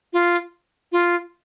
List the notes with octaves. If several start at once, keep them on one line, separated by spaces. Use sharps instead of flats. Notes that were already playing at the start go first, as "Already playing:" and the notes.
F4
F4